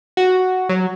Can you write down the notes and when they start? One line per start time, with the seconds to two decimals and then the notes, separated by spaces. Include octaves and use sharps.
0.17 F#4
0.69 F#3